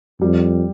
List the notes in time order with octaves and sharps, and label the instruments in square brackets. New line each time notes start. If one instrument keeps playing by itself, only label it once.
[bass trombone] F2 [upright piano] G3